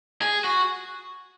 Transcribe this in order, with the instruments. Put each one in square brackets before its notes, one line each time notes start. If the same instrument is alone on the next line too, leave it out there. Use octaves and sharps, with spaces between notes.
[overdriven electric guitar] G#4
F#4